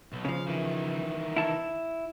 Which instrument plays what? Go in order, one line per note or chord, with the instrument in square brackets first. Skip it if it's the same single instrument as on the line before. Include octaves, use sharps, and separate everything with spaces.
[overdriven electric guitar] B1
[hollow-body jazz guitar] C#3 F3 [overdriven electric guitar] F5
[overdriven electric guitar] D#3 E3
[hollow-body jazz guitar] E4 A5